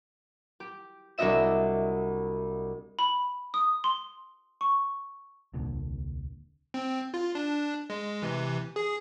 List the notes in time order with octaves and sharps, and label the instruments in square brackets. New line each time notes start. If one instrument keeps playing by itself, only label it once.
[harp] G4
C2 D4 F#4 D#5 E5 E7
[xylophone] B5
D#6
C6
C#6
[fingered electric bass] D#1 C2 A#2 D3
[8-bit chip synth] C4
F4
D4
G#3
C3 E3
G#4